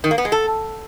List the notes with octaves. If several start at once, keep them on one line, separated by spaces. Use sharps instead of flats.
D#3
A#3
B3
G#3
A4